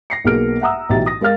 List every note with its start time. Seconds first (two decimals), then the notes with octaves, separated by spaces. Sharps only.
0.10 A#6 C7 C#7
0.25 B1 A#3 B3 G#4 F6 D7
0.61 E5 F#5 A#5 D#6 E6
0.89 B1 A2 E3 G4 E5 A6
1.06 D#6 A#6
1.21 G#3 A#4 F5 F6 A6